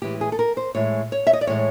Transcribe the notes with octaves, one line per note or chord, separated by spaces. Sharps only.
A2 E3 G#3 G4
G#4
A4
A#4
C5
A2 E3 G#3 C#5
C#5
E5
D#5
D5
A2 E3 G#3 C#5